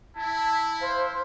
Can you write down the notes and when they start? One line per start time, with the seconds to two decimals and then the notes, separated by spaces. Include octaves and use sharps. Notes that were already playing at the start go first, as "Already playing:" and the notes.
0.17 E4 A5
0.80 C5 F5